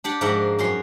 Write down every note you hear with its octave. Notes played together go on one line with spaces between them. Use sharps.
D4 G4 D5 F#5
G#2 F3 A#4 E5 F#5 G5
F#2 C#4 F#4 C6